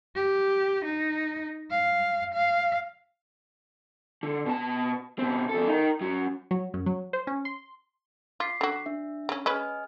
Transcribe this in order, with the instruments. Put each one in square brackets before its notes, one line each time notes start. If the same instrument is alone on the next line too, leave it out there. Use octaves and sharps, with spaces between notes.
[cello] G4
D#4
F5
F5
[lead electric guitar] D3
B2 A5
B2 C4
E2 A4
D#4 A#4
F#2 F#3
[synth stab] F#3
F#2
F#3
C5
C#4
C6
[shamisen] F4 [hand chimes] D6 B6 C7
[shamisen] D3 F#4
[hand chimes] D4 E5
[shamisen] C#3 C#4
[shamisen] G#3 C#4 B4 [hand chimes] D#5 G#5 F6